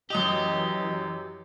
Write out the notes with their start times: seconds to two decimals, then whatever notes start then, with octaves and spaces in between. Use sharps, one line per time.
0.10 F#2 E3 G4 D#5 D#6 F7